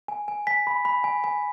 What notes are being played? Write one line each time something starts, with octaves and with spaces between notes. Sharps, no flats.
G#5
G#5
G#5 B6
B5
B5
G#5
G#5